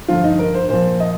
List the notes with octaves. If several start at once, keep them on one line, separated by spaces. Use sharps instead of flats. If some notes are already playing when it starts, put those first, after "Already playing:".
G2 D3 F3 F4
D#4
A#4
C5
A#2 F3 C5
D#5